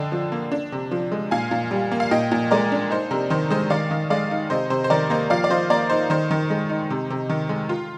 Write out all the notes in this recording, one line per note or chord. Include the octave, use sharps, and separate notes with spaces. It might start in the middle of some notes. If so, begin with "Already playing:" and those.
Already playing: D3 D4 D#5 G5
F3
A#3
D4
C3
F3
G#3
A#2 F5 G#5
A#2
G3
A#3
F5
A#2 D#5 G5
A#2
G#3 A#4 D5
D4
D#4 C5
C3 A#4
D#3 C5
G#3 C5 D#5
D#3 D5 F5
D#3
G#3 D5 F5
D#4
C3 C5 D#5
C3 C5
C5
D#3 A#4 D5
A#3 C5 D#5
F3 D5 F5
D5
F3 C5 D#5
A#3 A#4 D5
D#4 C5
D#3 C5
D#3
G#3
D#4
C3
C3
D#3
G#3
F4